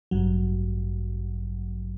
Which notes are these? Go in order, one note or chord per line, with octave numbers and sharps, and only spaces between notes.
A1 G2 F#3